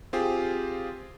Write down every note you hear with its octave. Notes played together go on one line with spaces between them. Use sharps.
C4 F4 G4 G#4 C5